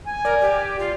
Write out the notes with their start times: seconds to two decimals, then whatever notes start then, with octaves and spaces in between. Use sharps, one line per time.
0.07 G#5
0.25 A#4 D5
0.41 G4
0.79 F4